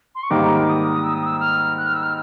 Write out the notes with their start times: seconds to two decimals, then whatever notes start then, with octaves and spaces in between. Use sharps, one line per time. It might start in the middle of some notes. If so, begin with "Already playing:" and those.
0.15 C6
0.23 C#6
0.30 G#2 D#3 G3 A#3 D6
0.68 D#6
1.04 E6
1.15 D#6
1.25 E6
1.40 F6
1.77 F#6
1.86 F6
1.94 E6
2.03 F6